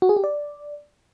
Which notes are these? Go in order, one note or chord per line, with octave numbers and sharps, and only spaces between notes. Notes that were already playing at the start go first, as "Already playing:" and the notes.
F#4
G#4
G4
D5